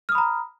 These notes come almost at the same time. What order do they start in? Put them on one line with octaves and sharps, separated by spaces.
F6 D#6 B5 A#5